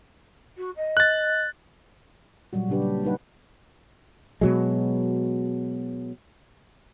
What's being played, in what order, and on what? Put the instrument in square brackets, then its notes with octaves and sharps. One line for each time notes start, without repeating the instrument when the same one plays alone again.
[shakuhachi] F#4
D#5
[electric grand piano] F#6 A6
[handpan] A#2 F#3 G3 F#4
A#2 C#3 D4 G4 B4
G3
G3 D#4 B4 F#5
[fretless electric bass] B2 F#3 G#3